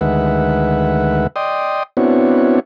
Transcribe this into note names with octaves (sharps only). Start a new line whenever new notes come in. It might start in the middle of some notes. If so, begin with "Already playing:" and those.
D2 D#3 G#3 B4 E5 F#5
D5 D#5 G5 C6 D#6
B3 C4 D4 E4 F#4 C#5